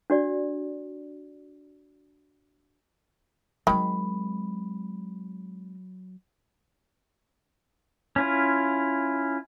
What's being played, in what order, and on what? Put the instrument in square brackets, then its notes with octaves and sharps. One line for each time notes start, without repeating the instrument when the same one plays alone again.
[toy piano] D4 F#4 D5
[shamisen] D#3 [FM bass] F#3 [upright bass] G#3 C4 [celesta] B5
[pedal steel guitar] C#4 E4 F4